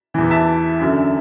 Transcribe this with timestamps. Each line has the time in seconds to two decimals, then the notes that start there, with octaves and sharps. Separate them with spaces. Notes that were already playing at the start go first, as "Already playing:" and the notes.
0.14 E2 E3
0.31 E5 A5
0.80 F#2 D3